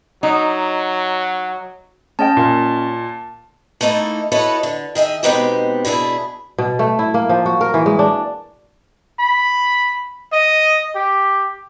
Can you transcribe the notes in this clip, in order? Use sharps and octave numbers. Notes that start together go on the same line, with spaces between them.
F#3 D#4
C#4 D#5 G5 A5
A#2
A3 A#3 D#4 E4 A4
E4 F#4 A4 B4 C#5 D#5
D3
D#3 G#4 D#5 E5
B2 G#3 B3 C4 D#4 G4
B2 D4 E4 G#4
B2
A3
E4
A#3
F3
F#4
A#4
E3
G#3
D4
B5
D#5
G4